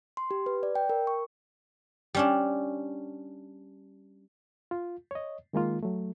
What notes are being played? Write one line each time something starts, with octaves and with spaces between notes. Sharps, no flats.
C6
G4
B4
D5
G5
A#4
C#6
G3 C#4 D4
F4
C#5 D#5
D#3 G#3 A#3 F4
F#3 A3